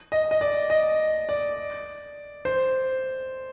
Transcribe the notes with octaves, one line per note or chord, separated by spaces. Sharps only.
D#5
D#5
D5
D#5
D5
C5